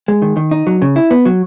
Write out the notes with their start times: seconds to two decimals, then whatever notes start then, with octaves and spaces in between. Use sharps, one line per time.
0.08 G#3
0.22 D#3
0.37 D#3
0.51 D#4
0.67 F#3
0.82 C#3
0.96 E4
1.11 B3
1.26 F#3